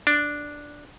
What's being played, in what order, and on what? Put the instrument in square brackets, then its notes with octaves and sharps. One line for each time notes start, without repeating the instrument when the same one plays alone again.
[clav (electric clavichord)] D4